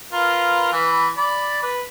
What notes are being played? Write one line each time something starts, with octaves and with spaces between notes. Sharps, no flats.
F4 A#4 B4
E3 B4 E5
D5 B5
B4